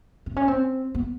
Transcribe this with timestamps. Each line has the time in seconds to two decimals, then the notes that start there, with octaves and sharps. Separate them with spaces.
0.26 C4
0.36 C#4
0.48 C4
0.95 B3